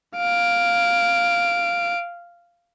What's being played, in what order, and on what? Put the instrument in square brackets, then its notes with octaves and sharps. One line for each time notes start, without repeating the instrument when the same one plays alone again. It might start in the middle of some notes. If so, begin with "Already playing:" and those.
[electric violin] F5 D7